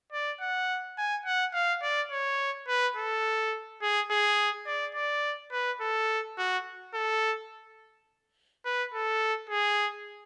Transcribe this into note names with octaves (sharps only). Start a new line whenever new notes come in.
D5
F#5
G#5
F#5
F5
D5
C#5
B4
A4
G#4
G#4
D5
D5
B4
A4
F#4
A4
B4
A4
G#4